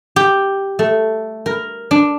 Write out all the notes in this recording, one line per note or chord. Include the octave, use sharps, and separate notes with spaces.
G4
A3
A#4
D4